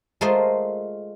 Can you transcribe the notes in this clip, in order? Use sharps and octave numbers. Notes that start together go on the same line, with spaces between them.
G#3 A3 F4 A#4 C5 D#5